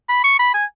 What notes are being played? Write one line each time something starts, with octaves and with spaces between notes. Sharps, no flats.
B5
C#6
B5
G#5